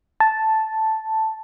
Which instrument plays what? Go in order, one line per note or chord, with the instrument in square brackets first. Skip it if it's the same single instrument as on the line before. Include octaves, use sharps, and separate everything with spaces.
[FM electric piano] A5